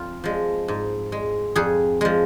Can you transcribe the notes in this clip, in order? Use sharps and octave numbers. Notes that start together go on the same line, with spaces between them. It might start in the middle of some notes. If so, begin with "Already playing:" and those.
Already playing: F2 F4
F3 G#3
G#2
G#3
F2 G#4
F3 G#3